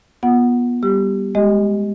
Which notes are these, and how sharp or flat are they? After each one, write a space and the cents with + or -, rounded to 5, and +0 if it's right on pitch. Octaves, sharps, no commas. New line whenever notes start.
B3 -25 F4 +15 F#5 +0
G3 +0 G4 +0 E6 +45
G#3 +0 G4 -5 D#5 +0